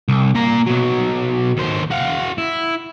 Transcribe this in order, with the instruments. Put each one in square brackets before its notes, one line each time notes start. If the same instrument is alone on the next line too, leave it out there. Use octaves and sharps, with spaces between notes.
[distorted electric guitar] C2
A#2 A#5
B1 F#3
D#2 C5
F#4 F5
E4